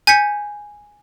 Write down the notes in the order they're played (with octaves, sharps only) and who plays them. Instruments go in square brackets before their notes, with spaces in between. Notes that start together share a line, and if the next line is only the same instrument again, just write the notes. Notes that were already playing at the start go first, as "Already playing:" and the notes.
[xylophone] G#5 G6 G#6 B6 C#7